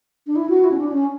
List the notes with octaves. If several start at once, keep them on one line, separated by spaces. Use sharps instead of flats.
D4
E4
F#4
E4
C#4
D4
C#4